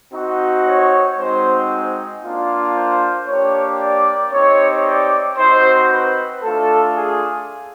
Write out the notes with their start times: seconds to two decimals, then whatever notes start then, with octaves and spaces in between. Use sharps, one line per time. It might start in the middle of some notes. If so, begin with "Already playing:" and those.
0.13 C4 D#4 F#4
0.66 C#5
1.18 G#3 C4 D#4 F#4 C5
2.23 A#3 D4 F4
2.75 C5
3.28 A#3 D4 G4 C#5
3.80 D5
4.32 C4 D#4 G4 C#5
4.85 D5
5.37 C4 D#4 F#4 C5
5.90 B4
6.42 A3 D4 F4 A4
6.95 G#4